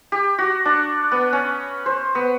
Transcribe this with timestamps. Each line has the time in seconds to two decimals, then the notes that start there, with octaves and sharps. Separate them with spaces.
0.12 G4
0.38 F#4
0.65 D4
1.12 B3
1.33 C#4
1.86 C5
2.15 B3